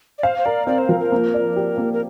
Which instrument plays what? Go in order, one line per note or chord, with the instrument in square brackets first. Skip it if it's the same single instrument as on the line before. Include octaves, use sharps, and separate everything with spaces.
[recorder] D5
[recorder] C5 [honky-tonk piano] F5
[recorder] C5
[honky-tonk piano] A#4 [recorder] D5
[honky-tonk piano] C4 [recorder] D5
[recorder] C5
[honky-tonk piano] F3 [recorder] A#4
[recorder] A#4
[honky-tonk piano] A#3
D5
G4
A#3
[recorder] A#4